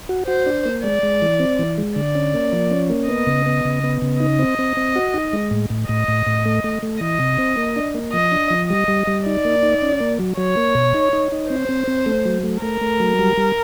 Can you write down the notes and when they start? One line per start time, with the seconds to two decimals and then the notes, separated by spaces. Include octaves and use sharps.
0.09 F#4
0.27 F#4 C5
0.46 D4
0.65 A#3
0.84 G#3 D5
1.03 G#3
1.22 E3
1.40 C4
1.59 E3
1.78 G#3
1.96 D3 D5
2.15 C#4
2.34 A#3
2.53 F3
2.71 C#4
2.90 A#3
3.08 B3 D#5
3.27 C#3
3.46 B3
3.65 C#3
3.84 B3
4.02 C#3
4.20 D#4 D#5
4.39 C4
4.59 C4
4.77 C4
4.96 F#4
5.14 D#4
5.33 G#3
5.51 A2
5.70 A2
5.89 A2 D#5
6.08 A2
6.27 A2
6.46 A3
6.64 A3
6.83 A3
7.01 E3 D#5
7.20 C3
7.38 C4
7.57 A#3
7.76 D4
7.95 A#3
8.13 F3 D#5
8.32 D4
8.50 F3
8.70 G3 D#5
8.88 G3
9.07 G3
9.26 D#4 D5
9.45 A#3
9.63 D#4
9.82 C#4
10.00 A#3
10.19 F#3
10.37 F#3 C#5
10.57 A#3
10.75 B2
10.94 D#4
11.13 D#4
11.32 D#4
11.50 C4 C5
11.69 C4
11.88 C4
12.06 A3
12.25 F#3
12.44 A3
12.62 A3 A#4
12.81 A3
13.00 F#3
13.19 G3
13.37 G3